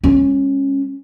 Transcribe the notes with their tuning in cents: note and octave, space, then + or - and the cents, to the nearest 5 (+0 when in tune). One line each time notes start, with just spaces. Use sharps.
G#3 -45 C#4 -15